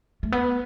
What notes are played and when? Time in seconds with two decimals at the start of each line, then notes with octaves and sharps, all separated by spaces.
0.23 A3
0.32 B3